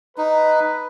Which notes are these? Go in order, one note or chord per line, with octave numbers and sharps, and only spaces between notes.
D#4 B4